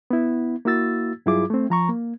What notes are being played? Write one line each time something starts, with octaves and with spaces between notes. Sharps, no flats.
B3 E4
A#3 E4 F#4 E6 A6
G2 F#3 E4 F4 G#4 D6
A3 C4
F3 A#5 C#6
A#3